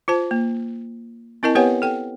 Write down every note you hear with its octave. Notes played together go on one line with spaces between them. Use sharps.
F4 C5 A5
A#3
C4 E4 A#4 D#5 A5
B3 G4 B4 C#5 F#5 G#5
A4 G5